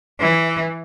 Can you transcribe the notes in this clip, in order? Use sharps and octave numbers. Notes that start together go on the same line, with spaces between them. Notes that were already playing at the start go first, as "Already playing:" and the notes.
E3